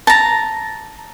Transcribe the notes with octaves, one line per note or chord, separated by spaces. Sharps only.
A5 A#5